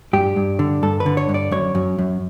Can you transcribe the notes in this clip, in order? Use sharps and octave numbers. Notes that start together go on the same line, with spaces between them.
G2 G4
G2
D3
G2 A4
B4
D3
C#5
G2
D5
F#2 C#5
F#2
F#2